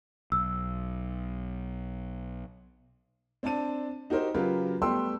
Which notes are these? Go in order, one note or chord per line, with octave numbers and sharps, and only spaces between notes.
B1 E6
C4 D4 D5 A5 D#7
D#4 F#4 G4 A#4 C5
C#3 F#3 F4 G4 A#4 B4
G3 A3 B3 G5 C6 E6